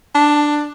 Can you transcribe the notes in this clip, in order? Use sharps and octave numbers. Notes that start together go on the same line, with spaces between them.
D4